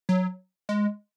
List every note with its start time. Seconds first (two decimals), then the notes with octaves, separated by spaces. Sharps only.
0.09 F#3
0.69 G#3